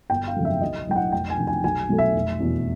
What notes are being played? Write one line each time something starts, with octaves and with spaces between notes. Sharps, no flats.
G1 G5
F5
F2 C#3 F#3 A3
E5
B1 D#5
A2 F#3 G5
F#5
F1 G5
G#5
F2 C3 D#3
G#5
B1 G#5
B2 F#3 A3
E5
F1
E2 B2